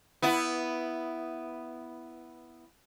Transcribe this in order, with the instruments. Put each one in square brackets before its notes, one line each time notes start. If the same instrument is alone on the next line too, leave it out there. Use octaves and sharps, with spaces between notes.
[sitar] B3 E4